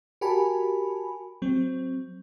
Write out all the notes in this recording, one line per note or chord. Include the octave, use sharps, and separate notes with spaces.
F#4 G4 A#4 G#5 A5 B5
F#3 C4